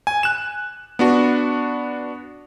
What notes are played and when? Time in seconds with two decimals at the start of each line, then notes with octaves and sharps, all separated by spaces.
0.07 G#5
0.23 F#6 E7
0.99 B3 D4 F#4